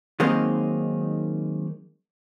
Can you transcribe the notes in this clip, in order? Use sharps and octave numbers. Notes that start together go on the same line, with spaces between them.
D#3 F#3 G#3 A#3 C4 D#4